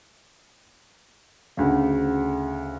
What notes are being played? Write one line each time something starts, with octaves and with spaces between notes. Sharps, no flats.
D2 C#3